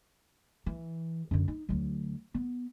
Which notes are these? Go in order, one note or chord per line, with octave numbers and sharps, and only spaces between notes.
E3
F#2 D3
D#4
D2 F#3
B3